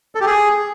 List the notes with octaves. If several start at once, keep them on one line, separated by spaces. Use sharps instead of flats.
A4
G4
G#4